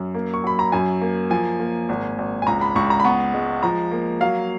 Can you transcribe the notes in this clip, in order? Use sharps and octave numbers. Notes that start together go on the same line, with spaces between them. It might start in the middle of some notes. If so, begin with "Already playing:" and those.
Already playing: F#2
A#3
C#6
F#3 B5
A#5
F#2 G#5
A#3
F3 G#5
A#3
G#1
G#1
G#5
C#2 A#5
B5
C#2 C#6
A#5
B5
B3 C#6
G#3
F3 A#5
A#3
F#3 F5